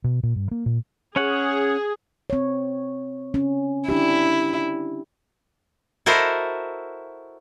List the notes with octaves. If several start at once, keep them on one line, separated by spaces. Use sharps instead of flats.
B2
A#2
G2
A#3
A#2
C#4 G#4 C#5 F#5
C4 C#5
C#4
D4 E4 G4
E4 F#4 A4 A#4 C5 D#5